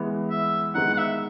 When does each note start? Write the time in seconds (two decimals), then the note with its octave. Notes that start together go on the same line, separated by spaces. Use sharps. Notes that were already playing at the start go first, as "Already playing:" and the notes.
Already playing: E3 G#3 B3
0.30 E5
0.75 D#3 G#3 B3 D#4 F#5
0.93 F#5
0.98 E5